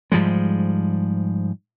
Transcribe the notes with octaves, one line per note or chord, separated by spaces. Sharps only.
G#2 F3 G3 G#3